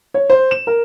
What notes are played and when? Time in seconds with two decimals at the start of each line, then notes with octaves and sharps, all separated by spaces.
0.14 C#5
0.30 C5
0.51 E7
0.67 A#4